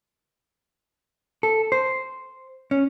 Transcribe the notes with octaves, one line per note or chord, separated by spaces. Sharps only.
A4
C5
C#4